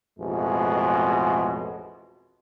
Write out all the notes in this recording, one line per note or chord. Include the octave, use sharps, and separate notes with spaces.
A1 F2 B2 G#3